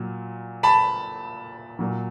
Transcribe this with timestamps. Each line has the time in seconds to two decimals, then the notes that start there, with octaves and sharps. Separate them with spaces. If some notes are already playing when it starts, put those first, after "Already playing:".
Already playing: A#2 F#3
0.63 A5 B5
1.79 A#2 F#3